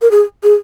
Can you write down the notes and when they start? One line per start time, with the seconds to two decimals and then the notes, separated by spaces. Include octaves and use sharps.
0.02 A#4
0.11 G#4
0.43 G#4